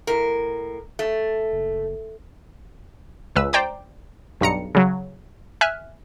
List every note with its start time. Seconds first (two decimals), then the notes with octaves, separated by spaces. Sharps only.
0.07 A2 A#4
0.99 A3
1.52 F#1
3.36 C#2 B4 E6
3.53 C5 D5 G5 A#5 D6
4.41 B1 G2 A#5 C#7
4.75 C#3 F#3
5.61 E5 G#5 F6 F#6